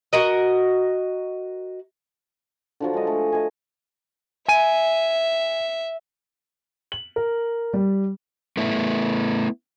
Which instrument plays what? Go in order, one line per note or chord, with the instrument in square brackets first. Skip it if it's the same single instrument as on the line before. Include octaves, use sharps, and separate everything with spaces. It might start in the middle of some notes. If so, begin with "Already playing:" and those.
[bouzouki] F#4 A#4 D#5
[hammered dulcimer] D3 F3 F#3
G#3 D#5
A3
D#5 G#5
[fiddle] E5 [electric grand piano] G#5 D#7
[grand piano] F#7
A#4
G3
[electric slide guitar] A3 B3 E4